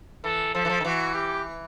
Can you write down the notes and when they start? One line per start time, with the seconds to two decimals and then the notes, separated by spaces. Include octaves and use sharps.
0.24 E3 A4
0.54 F3 A4
0.65 E3
0.70 F3
0.80 D#3
0.85 E3 F#4
1.15 G4